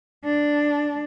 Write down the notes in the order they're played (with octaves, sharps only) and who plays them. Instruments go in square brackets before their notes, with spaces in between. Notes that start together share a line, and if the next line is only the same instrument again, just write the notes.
[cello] D4